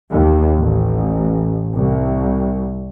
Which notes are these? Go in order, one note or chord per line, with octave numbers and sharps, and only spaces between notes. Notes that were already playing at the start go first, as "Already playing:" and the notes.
D#2
A1
C2